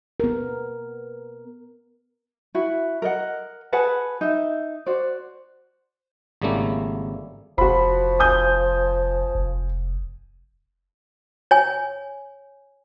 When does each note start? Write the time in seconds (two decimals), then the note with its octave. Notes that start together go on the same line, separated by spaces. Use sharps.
0.20 B3 A#4
2.55 E4 F#4
3.02 A#4 D#5 F#5
3.73 G#4 B4 F#5 A5
4.21 D#4 E5
4.86 F#4 C5 D5
6.42 G#1 C#3 G3 A3 A#3 E4
7.58 F1 F3 F#4 B5
8.19 G#5 D#6 G6
9.35 F1
11.51 C#5 G#5